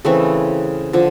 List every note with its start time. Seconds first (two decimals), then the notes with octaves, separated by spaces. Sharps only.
0.05 C#3 E3 A3 C4
0.93 D3 F3